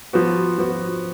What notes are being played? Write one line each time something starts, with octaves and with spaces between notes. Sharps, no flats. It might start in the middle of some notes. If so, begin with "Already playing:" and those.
F3 B3 F#4
F3 B3 F#4